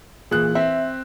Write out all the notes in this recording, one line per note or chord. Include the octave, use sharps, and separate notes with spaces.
A#2 E3 G#4 F#6
C4 E5